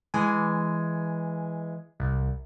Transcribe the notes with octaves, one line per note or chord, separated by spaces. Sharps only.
E3 G#3 G#5
C2